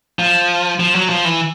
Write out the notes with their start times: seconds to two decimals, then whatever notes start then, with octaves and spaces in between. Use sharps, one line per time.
0.19 F3
0.80 F3
0.95 F#3
1.09 F3
1.25 E3